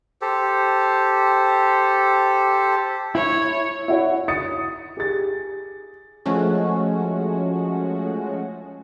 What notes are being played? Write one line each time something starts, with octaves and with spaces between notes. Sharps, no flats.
G4 A4 C5
E4 C#5
E4 F#4 C#5
D#6 A6 C#7
G4 G#4 A6
F3 G#3 A3 C#4 F#4